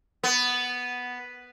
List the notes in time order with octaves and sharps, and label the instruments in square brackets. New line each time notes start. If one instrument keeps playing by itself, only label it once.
[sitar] B3